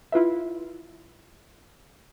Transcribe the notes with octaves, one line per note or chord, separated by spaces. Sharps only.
E4 F4 B4 E5